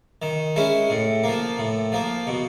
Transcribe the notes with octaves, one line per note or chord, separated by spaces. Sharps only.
D#3
G#3 C#4 E4
A2
F3 A#3
A2
F3 A#3
B2